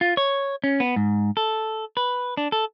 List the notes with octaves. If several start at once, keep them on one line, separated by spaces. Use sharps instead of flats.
F4
C#5
C#4
B3
G#2
A4
B4
D4
A4